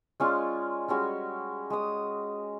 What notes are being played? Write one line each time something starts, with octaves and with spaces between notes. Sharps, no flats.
G#3 C#4 F4 D5
G3 G#3 C#4 F#4
G#3 D#6